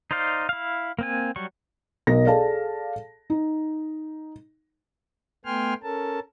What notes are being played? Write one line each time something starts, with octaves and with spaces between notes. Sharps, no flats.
D#4 C5 D5 F5
E4 F5
A#3 C4 G#5
F#3 G3 C#6
B1 A#4 D#5 A#6
G#4 A4 D5 F5 A5
D#4
A3 B3 G5 G#5 C6 F6
C#4 A4 A#4 A5